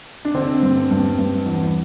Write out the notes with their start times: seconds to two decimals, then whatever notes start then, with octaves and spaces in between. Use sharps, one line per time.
0.25 D4
0.34 D3 C4
0.63 G2
0.91 G2
1.19 G2
1.46 E2